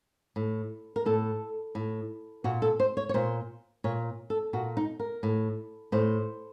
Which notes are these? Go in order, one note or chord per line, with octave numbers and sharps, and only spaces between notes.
A2
A#4
A2 A4
A2
A#2 F#4
A4
C5
C#5
C#5
A#2 C5
A#2 C#5
A4
A#2 F#4
D#4
A#4
A2
A2 C5